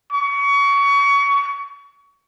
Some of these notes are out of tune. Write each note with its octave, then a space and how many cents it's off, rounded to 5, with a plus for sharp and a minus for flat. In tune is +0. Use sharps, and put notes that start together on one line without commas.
C#6 +25